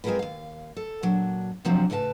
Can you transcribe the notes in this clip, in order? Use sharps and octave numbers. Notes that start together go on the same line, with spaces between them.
G#3 C4 F4 G#4 A#4 B4
D#2 F5
A4
A#2 F#3 D4
C3 F3 F#3 C4 D4
A2 C#3 B4 E5 A5